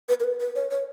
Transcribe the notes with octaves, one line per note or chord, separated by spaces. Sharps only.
B4
A#4
B4
B4
C#5
C#5